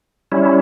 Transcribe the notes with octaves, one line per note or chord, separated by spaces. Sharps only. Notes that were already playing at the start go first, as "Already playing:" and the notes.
G3 C#4 E4